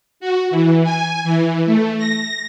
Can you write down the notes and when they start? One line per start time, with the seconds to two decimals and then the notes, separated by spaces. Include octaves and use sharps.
0.20 F#4
0.50 E3
0.83 G#5
1.24 E3
1.66 A3
1.97 A#6